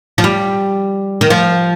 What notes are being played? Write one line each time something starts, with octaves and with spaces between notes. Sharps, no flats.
F3
G3
D#3
F3